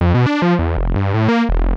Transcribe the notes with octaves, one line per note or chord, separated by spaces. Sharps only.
F2
B2
D4
F3
E2
F1
G2
A2
A#3
E1
F1